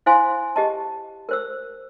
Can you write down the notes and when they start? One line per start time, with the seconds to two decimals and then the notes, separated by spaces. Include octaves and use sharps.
0.06 E4 C5 F5 G#5 C6
0.56 G4 D#5 A5
1.29 A#4 C5 E6